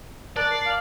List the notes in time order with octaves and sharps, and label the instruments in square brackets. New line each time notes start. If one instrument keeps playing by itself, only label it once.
[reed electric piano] A#4 A5 A6 [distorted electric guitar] D5 [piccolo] F#6
[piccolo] C7
F5